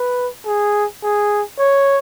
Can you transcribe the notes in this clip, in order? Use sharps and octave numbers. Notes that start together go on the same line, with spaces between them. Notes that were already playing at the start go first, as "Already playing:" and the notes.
Already playing: B4
G#4
G#4
C#5